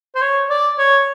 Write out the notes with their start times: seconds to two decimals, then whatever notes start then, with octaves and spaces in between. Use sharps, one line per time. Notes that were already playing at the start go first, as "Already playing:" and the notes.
0.15 C5
0.22 C#5
0.50 D5
0.78 C#5